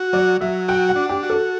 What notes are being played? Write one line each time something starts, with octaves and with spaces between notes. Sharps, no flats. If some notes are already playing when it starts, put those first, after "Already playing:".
Already playing: F#4
F#3 D5
F#3 E5
F#4 G5
F#5
D4
G4
F#4
A4